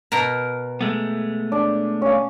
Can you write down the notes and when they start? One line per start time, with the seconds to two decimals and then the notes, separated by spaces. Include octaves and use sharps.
0.12 B2 A#4 A#5
0.81 G#3 A3 B3
1.52 D4
2.02 C#4 F5